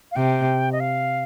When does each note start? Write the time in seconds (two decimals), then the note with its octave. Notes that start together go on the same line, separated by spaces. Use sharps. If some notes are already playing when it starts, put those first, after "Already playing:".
0.12 F5
0.16 C3 G5
0.72 D#5
0.80 F5